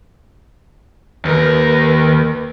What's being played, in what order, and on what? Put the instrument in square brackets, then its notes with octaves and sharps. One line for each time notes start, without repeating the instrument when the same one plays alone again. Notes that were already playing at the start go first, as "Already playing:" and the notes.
[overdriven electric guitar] D#2 A#4 [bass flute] B4